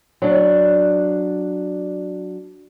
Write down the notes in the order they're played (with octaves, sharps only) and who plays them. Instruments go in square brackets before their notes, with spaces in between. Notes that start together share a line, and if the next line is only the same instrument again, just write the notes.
[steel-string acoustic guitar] F#3 D4